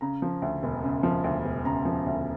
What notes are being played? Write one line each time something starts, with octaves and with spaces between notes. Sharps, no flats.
C#3 A#5
F3
D2
E1
C#3
F3
D2
E1
C#3 A#5
F3
D2